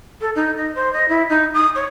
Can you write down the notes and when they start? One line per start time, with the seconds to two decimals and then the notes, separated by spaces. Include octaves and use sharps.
0.21 A4
0.35 D#4
0.57 D#5
0.75 C5
0.93 D#5
1.08 E4
1.29 D#4
1.54 D#6
1.75 C#5